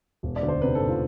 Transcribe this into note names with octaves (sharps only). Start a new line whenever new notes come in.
E1
D5
D2
C5
C3 B4
A4
E1
F4